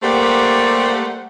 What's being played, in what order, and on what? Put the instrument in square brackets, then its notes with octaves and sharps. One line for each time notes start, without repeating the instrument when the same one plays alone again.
[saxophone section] G3 A3 A#3 G4 C5 F#5